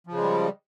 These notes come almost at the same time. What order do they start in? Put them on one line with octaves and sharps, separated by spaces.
F3 C#3 G#3 G3